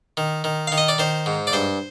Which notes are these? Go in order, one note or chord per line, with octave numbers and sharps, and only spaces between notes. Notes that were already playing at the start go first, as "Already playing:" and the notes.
D#3
D#3
D#3 F5
D#5
D5
D#3 C5
G#2
D5
G2 C5